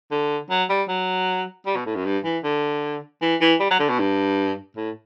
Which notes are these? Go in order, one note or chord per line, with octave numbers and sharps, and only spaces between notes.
D3
F#3
G3
F#3
G3
B2
A2
F#2
G2
E3
D3
E3
E3
G3
F#3
D3
B2
G2
A2